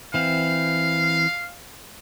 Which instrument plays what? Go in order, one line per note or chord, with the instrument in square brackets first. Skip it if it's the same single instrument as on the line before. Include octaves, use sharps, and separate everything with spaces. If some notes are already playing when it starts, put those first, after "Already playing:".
[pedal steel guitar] E3 C4 [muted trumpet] F5